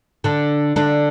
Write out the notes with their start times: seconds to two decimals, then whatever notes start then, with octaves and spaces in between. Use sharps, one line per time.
0.24 D3 D4
0.76 D3 D4